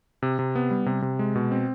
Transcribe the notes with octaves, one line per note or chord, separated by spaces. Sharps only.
C3
C3
B3
G3
C3
C3
G#3
B2
C4